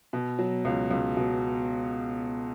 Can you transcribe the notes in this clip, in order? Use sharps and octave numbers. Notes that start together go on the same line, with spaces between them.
B2
F#3
C#2
C#2
B2